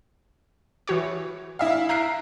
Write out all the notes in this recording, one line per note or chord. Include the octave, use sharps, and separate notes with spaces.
E3 F#4 C#5
E4 E5 F5
E5 A#5 F#6 C7 D7